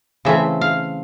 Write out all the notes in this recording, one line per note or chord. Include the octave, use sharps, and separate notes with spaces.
C#3 E3 A3 C4 E5
F5